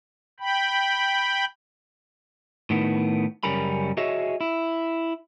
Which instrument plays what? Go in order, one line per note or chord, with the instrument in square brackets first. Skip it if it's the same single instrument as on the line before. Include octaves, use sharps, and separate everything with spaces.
[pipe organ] G5 B5
[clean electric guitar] A2 D#3 B3
F#2 C#3 G3 C#4 A#4 B5
F#4 G#4 C#5 D#5 E5
E4